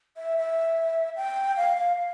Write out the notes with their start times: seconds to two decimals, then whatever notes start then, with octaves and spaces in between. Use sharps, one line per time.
0.17 E5
0.38 E5
1.16 G5
1.56 F5
1.77 F5
1.96 F5